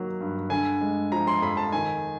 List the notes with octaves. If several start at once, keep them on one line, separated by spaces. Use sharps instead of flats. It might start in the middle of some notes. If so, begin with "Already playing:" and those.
Already playing: D#3 F#3 A#3
G2
D3 G#5
G#3
F3 A#5
C6
F2 B5
A5
D#3 G#5